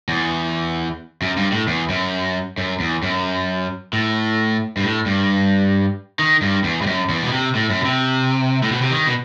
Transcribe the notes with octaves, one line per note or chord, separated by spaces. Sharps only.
E2
F#2
G2
A2
E2
F#2
F#2
E2
F#2
A2
G2
A2
G2
D#3
G2
E2
G2
F#2
E2
B2
C3
A2
F#2
B2
C3
A2
B2
C3
D#3
B2